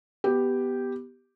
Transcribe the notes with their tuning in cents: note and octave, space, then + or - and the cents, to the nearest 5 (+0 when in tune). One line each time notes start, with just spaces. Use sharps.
B3 +0 G4 +0